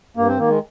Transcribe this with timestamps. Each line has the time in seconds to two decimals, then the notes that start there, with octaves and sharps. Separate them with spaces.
0.17 G2 A#3
0.27 C4
0.37 D#3 A#3
0.48 G#3